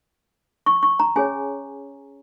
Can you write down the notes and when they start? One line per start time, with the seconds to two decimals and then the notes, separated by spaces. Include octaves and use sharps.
0.66 C#6
0.83 C#6
1.00 A#5
1.16 C#4 G#4 C#5 G#5